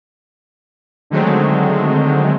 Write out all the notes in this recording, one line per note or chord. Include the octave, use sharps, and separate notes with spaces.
D3 D#3 F#3 G#3 A3 C4